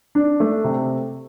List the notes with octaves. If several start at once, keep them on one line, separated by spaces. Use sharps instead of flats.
D4
A3
C3